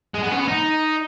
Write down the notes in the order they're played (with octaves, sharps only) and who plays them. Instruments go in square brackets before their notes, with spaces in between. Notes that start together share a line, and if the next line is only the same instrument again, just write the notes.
[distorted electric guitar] G#3
B3
C#4
B3
D#4